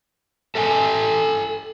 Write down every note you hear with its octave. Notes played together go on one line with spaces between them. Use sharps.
A4 E5 G5 G#5